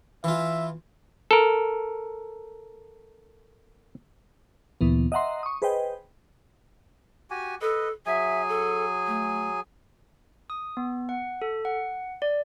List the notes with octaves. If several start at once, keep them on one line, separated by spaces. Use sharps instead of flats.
E3 F4 E5
A4 A#4
D2 A#2 E3 B3
D#5 E5 F#5 A#5 C6
C#6 D#6
G#4 B4 C5 D#5 G5
F#4 G4 G#5
A4 B4 D#5
F#3 G#4 E5 G#5
A4
A3
D#6
B3
F#5
A4
F#5
D5